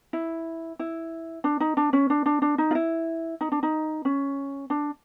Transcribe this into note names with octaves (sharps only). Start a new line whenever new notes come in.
E4
E4
D4
D#4
D4
C#4
D4
D4
D4
D#4
F4
E4
D#4
D4
D#4
C#4
D4